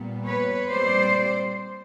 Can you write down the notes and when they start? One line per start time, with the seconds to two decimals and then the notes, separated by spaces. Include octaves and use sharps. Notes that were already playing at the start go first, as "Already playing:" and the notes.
Already playing: A#2 G3 B3
0.26 B4 C#5
0.71 A#2 G3 C4 C5 D5